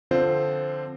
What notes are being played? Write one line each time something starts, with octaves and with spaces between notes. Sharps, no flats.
D3 F3 C4 F4 C5